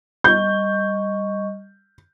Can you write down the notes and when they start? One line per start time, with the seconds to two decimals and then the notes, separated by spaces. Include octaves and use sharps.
0.24 G3 D#5 C#6 G6